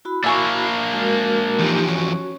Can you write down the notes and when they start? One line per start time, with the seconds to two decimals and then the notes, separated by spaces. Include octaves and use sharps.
0.05 E4 F#4 B5
0.24 A#3 D4 E5 G#5 C#6
0.93 G#3 F#4 A#4
1.59 E2 F3 D#4 G4
1.88 C#4 F#4